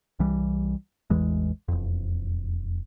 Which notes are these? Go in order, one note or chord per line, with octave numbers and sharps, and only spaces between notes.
C2 E3 G3
A1 E2 E3 G#3
E1 F2